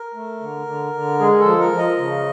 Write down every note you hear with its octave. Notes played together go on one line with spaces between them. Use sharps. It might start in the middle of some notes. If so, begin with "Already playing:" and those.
Already playing: A#4
A3
D3
D3
D3
G#3 G#4
A4
F3
A#4
F3
D#5
C#3